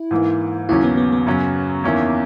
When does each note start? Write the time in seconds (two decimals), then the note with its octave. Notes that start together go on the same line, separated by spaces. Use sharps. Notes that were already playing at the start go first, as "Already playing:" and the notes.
Already playing: E4
0.11 G#2 E3 A#3
0.69 D#2 C#3 F#3 C#4 E4
0.84 B3
0.97 B3
1.12 B3
1.27 F#2 C#3 F#3 C#4
1.84 E2 D#3 A#3 C#4 E4